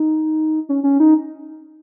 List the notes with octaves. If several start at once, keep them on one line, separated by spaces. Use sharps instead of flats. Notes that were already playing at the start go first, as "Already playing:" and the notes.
Already playing: D#4
C#4
C#4
D#4